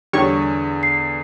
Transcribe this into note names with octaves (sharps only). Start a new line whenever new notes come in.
E2 D3 G3 C#5 C#6
C7